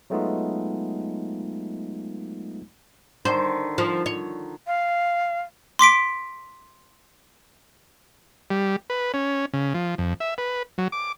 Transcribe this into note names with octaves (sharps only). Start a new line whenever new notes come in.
F#3 G#3 A3 B3 D#4 F4
D3 D#3 C5
F3
C#5
F5
C6 D6 B6 D7
G3
B4
C#4
C#3
F3
F2
E5
B4
F#3
D6